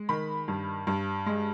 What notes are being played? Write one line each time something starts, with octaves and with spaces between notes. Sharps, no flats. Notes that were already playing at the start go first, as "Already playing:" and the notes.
Already playing: G#3
D#3 B5
G2
G2
G#3